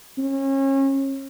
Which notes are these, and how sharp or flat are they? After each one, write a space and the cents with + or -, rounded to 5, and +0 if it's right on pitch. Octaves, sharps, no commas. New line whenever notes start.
C#4 -30